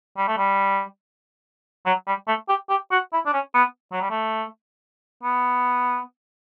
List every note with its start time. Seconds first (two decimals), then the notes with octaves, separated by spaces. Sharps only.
0.17 G3
0.28 A3
0.38 G3
1.86 F#3
2.07 G3
2.28 A3
2.48 G4
2.69 G4
2.91 F#4
3.13 E4
3.26 D4
3.33 C#4
3.54 B3
3.92 F#3
4.01 G3
4.10 A3
5.23 B3